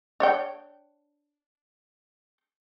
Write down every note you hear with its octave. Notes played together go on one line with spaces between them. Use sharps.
D4 C#5 G5